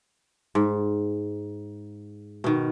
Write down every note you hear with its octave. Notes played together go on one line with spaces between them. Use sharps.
G#2
B2 D#3